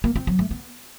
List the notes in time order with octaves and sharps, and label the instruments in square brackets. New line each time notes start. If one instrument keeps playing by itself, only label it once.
[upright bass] A#3
C4
F#3
A3
B3